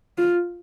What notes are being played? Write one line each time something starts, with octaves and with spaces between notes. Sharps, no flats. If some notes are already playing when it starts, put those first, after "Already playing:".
F4